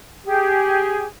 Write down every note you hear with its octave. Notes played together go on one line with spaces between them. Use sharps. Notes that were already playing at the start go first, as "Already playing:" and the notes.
G4 G#4